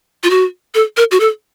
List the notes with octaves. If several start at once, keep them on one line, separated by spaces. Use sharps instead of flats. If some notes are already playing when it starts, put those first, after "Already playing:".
F4
F#4
A4
A#4
F#4
A4